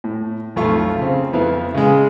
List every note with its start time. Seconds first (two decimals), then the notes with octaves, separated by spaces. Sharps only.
0.04 A2
0.56 B1 F2 A3 F4 C#6
0.98 C#3 C4
1.33 F2 B3 E4 F5
1.74 C#3 G#3